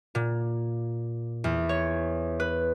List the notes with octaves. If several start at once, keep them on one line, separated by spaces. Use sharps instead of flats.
A#2
E2
C#5
B4